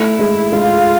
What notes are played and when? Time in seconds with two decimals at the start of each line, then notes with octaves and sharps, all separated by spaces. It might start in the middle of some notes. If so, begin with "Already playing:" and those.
Already playing: A3 E4
0.19 G#3
0.52 G#3 F4